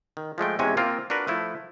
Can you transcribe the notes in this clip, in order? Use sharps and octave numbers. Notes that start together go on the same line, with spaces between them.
D#3
F3 G#3 A3 G5
E2 C3 G#3 C#4 F#4 G#5
A#3 C4 F4
D4 F#4 A#4 B4
F3 A3 E4